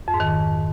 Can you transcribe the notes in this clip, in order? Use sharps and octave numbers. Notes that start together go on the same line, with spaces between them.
F2
G#2
D#3